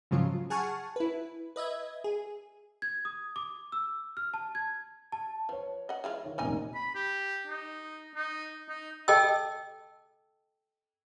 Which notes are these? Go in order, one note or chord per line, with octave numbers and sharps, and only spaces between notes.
G#2 C#3 F3 F#3 F4
G#4 F#5 G#5 A5 C#6 F6
E4 B4
B4 D#5 E5 G#6
G#4
G#6
D#6
D6
E6
F6
A5
G#6
A5
F3 B4 C#5
D#5 F#5
E3 G#3 F4
D#3 C#5
F1 A#2 D#3 C#4 D#4 G#5
B5
G4
D#4
D#4
D#4
A4 D#5 G5 A5 E6